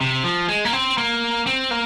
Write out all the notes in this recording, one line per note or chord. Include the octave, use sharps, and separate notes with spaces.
C3
F3
G#3
A#3
C4
A#3
C4
A#3